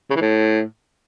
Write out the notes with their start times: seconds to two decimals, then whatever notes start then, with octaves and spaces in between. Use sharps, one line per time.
0.10 C#3
0.15 E3
0.21 A2